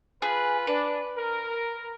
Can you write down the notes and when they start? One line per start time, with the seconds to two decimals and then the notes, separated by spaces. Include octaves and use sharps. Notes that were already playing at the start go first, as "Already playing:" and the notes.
0.22 F4 G#4 B4
0.67 D4 B4
1.18 A#4